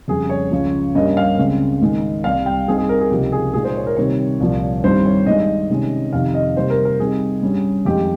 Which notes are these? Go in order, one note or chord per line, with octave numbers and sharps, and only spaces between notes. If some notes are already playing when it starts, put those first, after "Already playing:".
F2 C#3 G3 G#4
C#5
C#2 C#3 F3
G2 G3 A#3 C#4 D#5
F5
C#2 C#3 G#3 C4
G#2 D#3 G#3 D#4
C2 C3 G3 F5
G5
G2 G3 C4 D#4 G#4
G#4
A#4
G#4
C#2 C3 F3 A#3 D#4 G4
G#4
A#2 G#3 D#4 G#4
C5
C#5
A#4
C3 D#3 G3 C4 C#5
C2 A#2 F3
G2 D#3 G3 C4 C5
C#5
G2 D#3 G#3 D#5
C3 D#3 G#3 C#4
F2 C3 D#3 F5
D#5
C3 G3 A#3 D#4 C5
A#4
A#4
C3 G3 C4 D#4 G#4
G2 G3 C#4
F2 D#3 G#3 D#4 G4